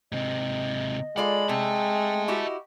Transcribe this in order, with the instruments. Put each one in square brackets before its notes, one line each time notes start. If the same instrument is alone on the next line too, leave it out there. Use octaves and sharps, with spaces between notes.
[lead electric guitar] G#2 C3 [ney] D#5
[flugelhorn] G#3 [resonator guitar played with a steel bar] F4 A4 D5 [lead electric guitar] B5
[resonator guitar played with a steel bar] C3 [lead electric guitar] E5 A5 [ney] G5
[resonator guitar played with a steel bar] E4 F#4 G4 [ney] D#5